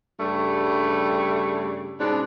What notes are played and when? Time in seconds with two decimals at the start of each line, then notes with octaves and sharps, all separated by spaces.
0.20 G2 C#3 G3 A3
1.99 G#2 B2 C#4 D4